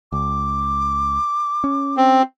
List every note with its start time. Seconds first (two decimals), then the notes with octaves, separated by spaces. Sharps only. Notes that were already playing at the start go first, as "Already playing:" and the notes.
0.12 C#2 D6
1.64 C#4
1.97 C4